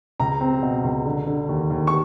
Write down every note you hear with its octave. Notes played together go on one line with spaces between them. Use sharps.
C#2 A#5
C4
B2
C#2
D3
D3
D#2
D#2
C#6